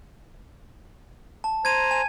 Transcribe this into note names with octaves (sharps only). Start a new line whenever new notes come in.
A5
C5 A#5 G#6 D#7
G#5